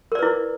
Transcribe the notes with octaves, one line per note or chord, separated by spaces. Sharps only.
E4 A#4 B4 D5